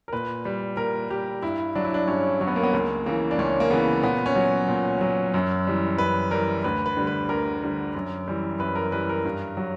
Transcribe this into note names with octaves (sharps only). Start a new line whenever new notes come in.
A#4
A#2 B4
G3
A#2 A#4
G3 G4
G2 E4
F#3 D4
E4
D4
G2 C#4
F#3 C#4
B3
A#3
B3
C#2 A#3
C#3 E3 A#3
D4
C#2 C#4
A#3
C#3 E3 B3
A#2 B3
C#4
F#3
A#2
F#3
F#2
E3 G3
F#2 B4
E3 G3 A#4
D2 B4
B4
D3 G3
B4
D2 A#4
D3 G3
F#2
E3 G3
F#2 B4
A#4
E3 G3 B4
A#4
G2
F#3